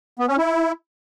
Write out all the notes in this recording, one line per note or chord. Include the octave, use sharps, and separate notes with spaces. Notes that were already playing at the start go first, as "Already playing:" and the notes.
B3
C#4
E4